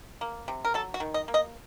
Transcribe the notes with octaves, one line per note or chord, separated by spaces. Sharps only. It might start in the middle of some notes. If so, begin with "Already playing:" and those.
A#3
C3
A#4
F#3 A4
F#4
D#3
D#5
A#3
D#5